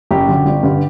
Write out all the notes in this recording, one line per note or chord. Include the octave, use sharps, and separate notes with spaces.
F#1 G4
F#2 D3
G1
G2 D3